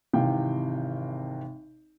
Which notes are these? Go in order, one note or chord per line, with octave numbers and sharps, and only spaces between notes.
G#1 C3 E3 F5 G5